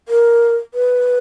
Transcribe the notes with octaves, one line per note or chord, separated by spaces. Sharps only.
A#4
B4